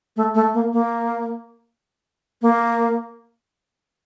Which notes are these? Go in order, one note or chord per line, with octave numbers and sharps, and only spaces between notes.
A3
A3
A#3
A#3
A#3